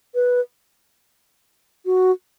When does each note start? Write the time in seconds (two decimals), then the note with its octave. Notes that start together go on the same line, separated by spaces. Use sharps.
0.15 B4
1.86 F#4